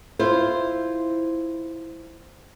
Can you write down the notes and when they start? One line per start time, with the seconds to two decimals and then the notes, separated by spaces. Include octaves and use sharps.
0.19 E4 F4 C5